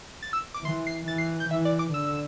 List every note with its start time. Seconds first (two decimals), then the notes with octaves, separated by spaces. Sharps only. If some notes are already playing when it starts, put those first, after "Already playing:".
0.22 A6
0.33 E6
0.54 D6
0.65 E3 C6
0.87 C7
1.08 E3 A6
1.18 C7
1.40 G6
1.50 E3 E5
1.65 D5
1.79 D6
1.93 D3 E6